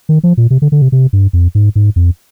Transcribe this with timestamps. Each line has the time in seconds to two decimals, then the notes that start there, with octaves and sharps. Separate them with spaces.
0.09 D#3
0.23 F3
0.37 A#2
0.50 C3
0.62 D3
0.72 D3
0.82 C3
0.92 C3
1.13 G2
1.33 F2
1.55 G#2
1.76 G#2
1.96 F2